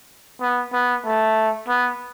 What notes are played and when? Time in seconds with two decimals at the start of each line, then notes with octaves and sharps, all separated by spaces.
0.41 B3
0.72 B3
1.04 A3
1.68 B3